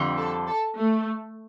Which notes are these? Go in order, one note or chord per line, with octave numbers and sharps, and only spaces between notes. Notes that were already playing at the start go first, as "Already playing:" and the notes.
Already playing: F2 D3 G3
A4
A4
A3